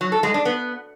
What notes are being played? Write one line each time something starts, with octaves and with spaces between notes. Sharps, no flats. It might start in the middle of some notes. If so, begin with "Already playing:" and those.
F#3
A4
G#3
D4
B3